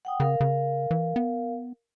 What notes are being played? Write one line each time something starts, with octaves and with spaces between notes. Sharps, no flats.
F#5 G5 D#6
C#3 A#4 F5
C#3
E3
B3